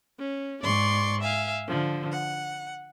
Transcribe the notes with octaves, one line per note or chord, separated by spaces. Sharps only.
C#4
G#2 D5 C6 C#6
E5 F5 G#5
D3 F3
F#5